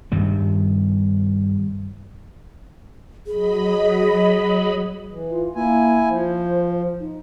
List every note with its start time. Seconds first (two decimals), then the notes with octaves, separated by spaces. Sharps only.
0.12 G2 D#3 G3
3.27 F#3 G#4 D#5 B5
5.11 E3
5.30 F4
5.55 A#3 E4 G#5
6.10 F3 C5
7.00 D#4